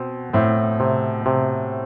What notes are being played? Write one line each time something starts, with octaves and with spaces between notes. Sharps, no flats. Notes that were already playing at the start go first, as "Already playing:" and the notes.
Already playing: B2 C4
A2 C4
C3
C3